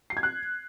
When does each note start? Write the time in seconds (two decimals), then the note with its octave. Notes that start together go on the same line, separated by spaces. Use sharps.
0.10 C7
0.17 G#6
0.23 F#6